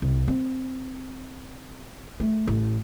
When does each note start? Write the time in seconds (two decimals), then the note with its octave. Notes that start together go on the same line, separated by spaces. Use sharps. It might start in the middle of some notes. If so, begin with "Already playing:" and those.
0.02 C2
0.28 C4
2.20 A3
2.47 A1